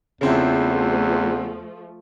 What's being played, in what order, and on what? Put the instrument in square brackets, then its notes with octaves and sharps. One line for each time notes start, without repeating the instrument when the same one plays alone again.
[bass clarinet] E2 [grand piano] C#3 C4 E4 [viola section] F3 A3